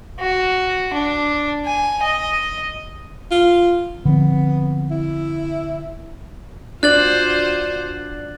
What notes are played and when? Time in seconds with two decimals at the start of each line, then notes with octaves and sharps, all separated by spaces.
0.20 F#4
0.93 D4
1.66 G#5
2.03 D#5
3.31 F4
4.05 D3 F3 B3 C4
4.91 E4
6.83 D4 F4 F#4 C5 D5 F#6 A6 F#7